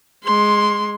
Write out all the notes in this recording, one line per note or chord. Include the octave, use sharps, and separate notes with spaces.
G#3 C6